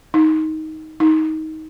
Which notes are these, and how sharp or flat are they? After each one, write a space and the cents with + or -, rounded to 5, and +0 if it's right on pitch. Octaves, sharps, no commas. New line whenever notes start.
D#4 +15
D#4 +20